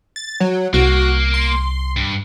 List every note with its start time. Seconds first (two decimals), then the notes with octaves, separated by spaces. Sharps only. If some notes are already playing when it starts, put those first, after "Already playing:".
0.16 A6
0.40 F#3
0.74 C2 A#3 F#4
1.34 C6
1.97 G2